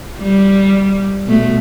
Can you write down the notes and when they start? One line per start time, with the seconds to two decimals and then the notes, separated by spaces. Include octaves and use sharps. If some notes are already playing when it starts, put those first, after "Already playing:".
0.18 G3
1.26 B2 A3